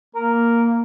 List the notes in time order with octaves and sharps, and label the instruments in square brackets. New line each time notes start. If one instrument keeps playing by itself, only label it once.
[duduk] A#3 [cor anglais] A#4